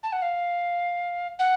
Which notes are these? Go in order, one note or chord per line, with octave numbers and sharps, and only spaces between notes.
A5
F#5
F5
F#5